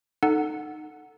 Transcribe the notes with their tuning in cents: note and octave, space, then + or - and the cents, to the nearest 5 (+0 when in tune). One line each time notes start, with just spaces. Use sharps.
D#4 -15 A4 +5 F#5 +0